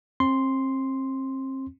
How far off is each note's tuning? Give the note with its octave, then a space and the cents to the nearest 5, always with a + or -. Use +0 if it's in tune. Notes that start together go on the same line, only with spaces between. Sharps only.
C4 +35 C6 +0